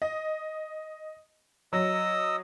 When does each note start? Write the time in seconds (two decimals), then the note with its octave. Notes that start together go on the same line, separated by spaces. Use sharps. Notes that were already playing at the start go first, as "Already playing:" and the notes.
0.02 D#5
1.73 F#3 D#5 D#6 E6